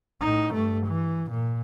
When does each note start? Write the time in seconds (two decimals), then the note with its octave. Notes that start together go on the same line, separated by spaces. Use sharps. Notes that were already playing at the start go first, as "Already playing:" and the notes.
0.21 A2 D#4
0.54 G2 A3
0.87 E3
1.32 A#2